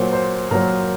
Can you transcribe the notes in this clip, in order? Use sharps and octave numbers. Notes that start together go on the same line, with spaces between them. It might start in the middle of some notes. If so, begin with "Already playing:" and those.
Already playing: A#2 F#3 C5
C5
A#2 F#3 A#4